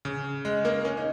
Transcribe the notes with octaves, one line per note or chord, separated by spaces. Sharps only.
C#3
G#3
A#3
C#4
D#4